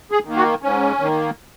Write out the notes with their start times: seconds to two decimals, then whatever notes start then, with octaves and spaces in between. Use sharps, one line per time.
0.11 G#4
0.25 D#3 A#3
0.36 F#4
0.62 G#2 C#4
1.00 D#3 A#3